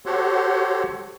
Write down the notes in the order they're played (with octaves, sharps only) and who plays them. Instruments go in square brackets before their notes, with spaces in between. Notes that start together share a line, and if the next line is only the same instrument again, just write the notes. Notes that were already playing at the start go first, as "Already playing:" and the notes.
[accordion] F#4 G4 A4 C5 C#5 F#5